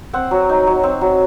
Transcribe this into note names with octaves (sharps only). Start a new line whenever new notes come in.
C4 F#5
F#3
D#4
F#3
C4
F#3